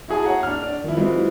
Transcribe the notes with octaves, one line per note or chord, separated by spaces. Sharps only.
E4 F#4 G#4 G#5 A5
C#5 F#5 A#5
D4 F6
D5
D#3 F3 E4
E3 F#3 G#3 C4 F4